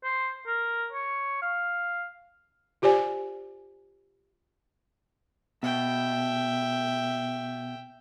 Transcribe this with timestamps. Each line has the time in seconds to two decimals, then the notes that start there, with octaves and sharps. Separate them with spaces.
0.04 C5
0.47 A#4
0.92 C#5
1.42 F5
2.82 F4 G4 C5 D5 G#5
5.63 B2 E5 G5